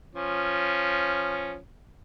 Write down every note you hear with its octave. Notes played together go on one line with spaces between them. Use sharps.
F3 C#4